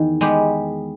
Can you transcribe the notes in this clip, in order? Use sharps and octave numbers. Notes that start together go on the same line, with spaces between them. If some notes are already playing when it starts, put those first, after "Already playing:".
Already playing: E2 D#3
G#3 B3 G4